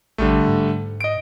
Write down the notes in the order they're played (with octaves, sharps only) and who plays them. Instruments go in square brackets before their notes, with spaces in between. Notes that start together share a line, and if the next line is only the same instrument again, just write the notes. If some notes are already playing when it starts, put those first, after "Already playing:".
[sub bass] A1 [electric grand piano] D3 G3 A3
[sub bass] G#2
[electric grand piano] D#5 D7